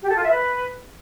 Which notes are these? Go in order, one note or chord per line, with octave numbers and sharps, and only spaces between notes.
G4
A4
F4
E5
B4